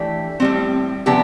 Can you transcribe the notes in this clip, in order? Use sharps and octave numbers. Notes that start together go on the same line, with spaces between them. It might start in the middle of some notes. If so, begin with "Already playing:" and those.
Already playing: E3 A3 D4 G4
A2 G3 C4
C3 F3 B3 D4 G4